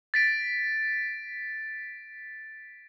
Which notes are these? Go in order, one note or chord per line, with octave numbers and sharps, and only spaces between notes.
A6 B6 D7